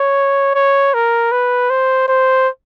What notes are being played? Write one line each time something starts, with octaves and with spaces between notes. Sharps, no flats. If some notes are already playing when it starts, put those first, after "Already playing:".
Already playing: C#5
C#5
A#4
B4
C5
C5